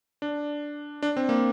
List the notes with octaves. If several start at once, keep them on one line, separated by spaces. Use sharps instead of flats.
D4
D4
C4
A#3